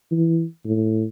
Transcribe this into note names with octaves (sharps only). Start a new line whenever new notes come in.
E3
A2